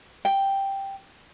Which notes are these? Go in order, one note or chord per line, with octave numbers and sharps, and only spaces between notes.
G5